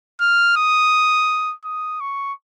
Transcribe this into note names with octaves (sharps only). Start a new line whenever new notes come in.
F6
D#6
D#6
C#6